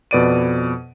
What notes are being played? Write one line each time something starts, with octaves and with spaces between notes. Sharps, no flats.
F2 B2 B4 D5 D7 D#7